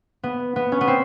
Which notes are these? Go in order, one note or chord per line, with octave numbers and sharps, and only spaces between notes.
B3
B3
C#4
B3
C4